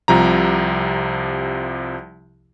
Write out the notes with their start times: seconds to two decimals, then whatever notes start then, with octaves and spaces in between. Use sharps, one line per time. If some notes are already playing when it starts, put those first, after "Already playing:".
0.08 C2 C3 F3 A#5